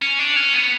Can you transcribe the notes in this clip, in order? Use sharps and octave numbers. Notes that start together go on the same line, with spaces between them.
C#4
D4
C#4
B3